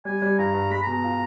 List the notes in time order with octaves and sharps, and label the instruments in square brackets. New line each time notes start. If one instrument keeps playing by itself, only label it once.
[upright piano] G3 [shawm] G#5
[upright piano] G3
[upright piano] G2 [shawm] A#5
[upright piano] G2
[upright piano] G#3 [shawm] B5
[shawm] A#5
[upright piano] B2
[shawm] A#5
[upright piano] F4